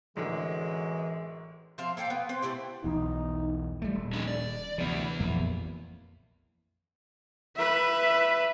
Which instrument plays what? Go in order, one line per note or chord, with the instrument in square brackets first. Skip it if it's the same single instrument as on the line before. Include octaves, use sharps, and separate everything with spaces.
[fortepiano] A1 D3 [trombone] F#2 [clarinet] E3 [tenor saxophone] G#3
[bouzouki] F3 C4 E5 F5
A#3 A4 F5 G5
B3
C4 B4 C5
A3 C4 E4 G4
[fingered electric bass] B1 E2 [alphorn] D#4
[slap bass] G3 A3
D#1
[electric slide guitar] C#4 D#4 G#4
D5
[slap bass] D2 C3 [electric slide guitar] E3 B3
[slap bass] A#1 F2 A#3
[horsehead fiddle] B4 E5